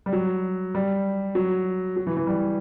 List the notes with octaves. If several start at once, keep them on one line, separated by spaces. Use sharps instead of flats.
G3
F#3
G3
F#3
F#3
E3
E3
G3